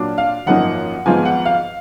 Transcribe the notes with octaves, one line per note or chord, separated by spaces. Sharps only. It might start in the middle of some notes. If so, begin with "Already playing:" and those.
Already playing: A#2 F#3 D4 F4
F5
G#1 F#2 F3 A#3 D#4 F#5
G#1 G#2 F3 B3 F4 G#5
F#5
F5